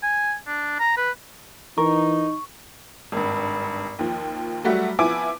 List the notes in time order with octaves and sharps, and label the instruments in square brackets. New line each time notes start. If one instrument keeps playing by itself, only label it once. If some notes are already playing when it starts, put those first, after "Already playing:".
[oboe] G#5
D4
A#5
B4
[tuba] E3 [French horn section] D#4 [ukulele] A#4 [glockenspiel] C#6
[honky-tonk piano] G#1 G2
D#2 F3
F#3 G3 A3 F#4
F3 B3 E4 G#5 D6 D7